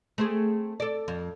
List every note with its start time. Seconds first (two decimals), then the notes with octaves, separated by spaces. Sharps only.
0.18 A3 C4 G#4
0.80 A4 D5
1.08 F2